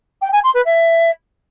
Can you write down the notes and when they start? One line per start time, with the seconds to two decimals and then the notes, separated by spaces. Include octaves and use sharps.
0.21 G5
0.32 G#5
0.43 C6
0.54 B4
0.65 E5